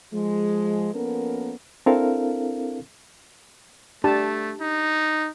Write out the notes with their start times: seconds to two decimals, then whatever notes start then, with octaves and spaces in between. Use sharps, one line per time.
0.13 F3 G#3
0.95 F3 A#3 B3 C#4 A4 A#4
1.86 C4 D4 E4 A4 A#4 F5
4.04 A3 D4 G4 A5
4.60 D#4